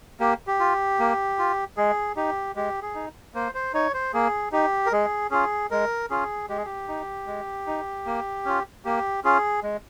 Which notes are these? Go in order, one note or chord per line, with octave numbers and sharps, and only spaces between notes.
A#3 G4
G4
F4
A#3
F4
G#3 G#4
D#4 G4
G#3 G4
G#4
D#4
A#3 C5
C5
D#4 C#5
C5
A#3 G#4
D#4 G4
A#4
G#3 G#4
C#4 F4 G#4
G#3 A#4
C#4 F4 G#4
G#3 G4
G#4
G4
D#4
G#3
D#4
A#3
C#4 F4
A#3 G4
C#4 F4 G#4
G#3